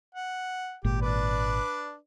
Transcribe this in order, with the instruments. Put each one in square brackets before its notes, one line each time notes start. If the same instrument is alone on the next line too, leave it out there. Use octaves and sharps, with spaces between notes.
[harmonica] F#5
[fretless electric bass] G#1 A#2 [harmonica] G4
[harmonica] D4 B4 D5